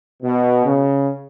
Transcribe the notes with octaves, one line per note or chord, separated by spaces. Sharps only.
B2
C#3